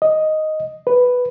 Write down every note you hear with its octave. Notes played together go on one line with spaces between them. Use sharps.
D#5
B4